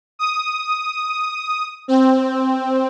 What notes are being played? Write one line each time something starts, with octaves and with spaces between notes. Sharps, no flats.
D#6
C4